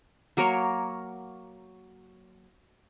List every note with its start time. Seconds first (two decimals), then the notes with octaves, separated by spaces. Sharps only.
0.37 F#3 A#3 A#4 C#5